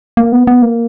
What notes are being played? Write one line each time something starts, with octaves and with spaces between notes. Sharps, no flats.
A#3
B3
B3
A#3